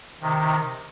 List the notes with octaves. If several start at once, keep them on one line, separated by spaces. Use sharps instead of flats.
C3 D#3